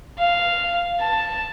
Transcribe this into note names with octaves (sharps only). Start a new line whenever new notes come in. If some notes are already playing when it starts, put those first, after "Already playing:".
F5
A5